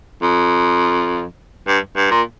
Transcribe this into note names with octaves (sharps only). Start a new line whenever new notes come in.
F2
G2
G2
A#2